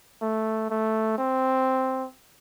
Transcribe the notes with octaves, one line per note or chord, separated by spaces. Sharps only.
A3
A3
C4